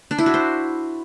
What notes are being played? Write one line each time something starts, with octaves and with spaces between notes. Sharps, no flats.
D4
E4
F#4
C5